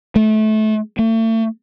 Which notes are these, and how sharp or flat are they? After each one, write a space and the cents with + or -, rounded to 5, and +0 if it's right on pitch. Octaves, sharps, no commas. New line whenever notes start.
A3 -25
A3 +35